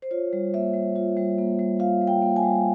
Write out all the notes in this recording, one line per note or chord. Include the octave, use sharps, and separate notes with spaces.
C5
F4 C#5
G3
A#3 E5
G3
F4
G3
A#3
G3
F4 F5
G3
G5
A#3
G#5
G3